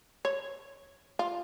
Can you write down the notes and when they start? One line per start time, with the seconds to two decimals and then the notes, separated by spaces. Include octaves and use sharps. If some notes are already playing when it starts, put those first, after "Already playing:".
0.25 C#5
1.19 F4